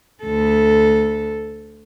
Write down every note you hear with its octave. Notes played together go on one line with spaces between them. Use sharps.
D2 A4